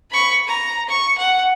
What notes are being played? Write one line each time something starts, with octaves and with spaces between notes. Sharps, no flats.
B5 C#6
A#5
C#6
F#5